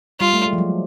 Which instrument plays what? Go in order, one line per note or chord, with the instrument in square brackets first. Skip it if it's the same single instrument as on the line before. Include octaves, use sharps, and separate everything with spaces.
[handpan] G3 [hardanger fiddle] F4
[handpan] A3
G#3
F3
F#3